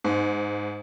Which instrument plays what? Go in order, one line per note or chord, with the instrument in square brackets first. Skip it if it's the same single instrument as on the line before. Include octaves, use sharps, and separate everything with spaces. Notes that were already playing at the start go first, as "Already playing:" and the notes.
[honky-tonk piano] G#2